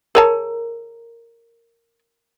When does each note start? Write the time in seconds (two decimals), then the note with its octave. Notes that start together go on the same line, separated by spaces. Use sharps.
0.15 G#4 A#4 C#5 A5 A#5